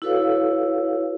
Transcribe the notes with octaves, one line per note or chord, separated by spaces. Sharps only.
E4 F#4 A4 B4 C#5 F5